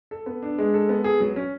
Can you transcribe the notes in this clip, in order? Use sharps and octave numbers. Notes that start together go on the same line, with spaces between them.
A4
B3
D4
G#3
A4
B3
G#4
F#3
C#4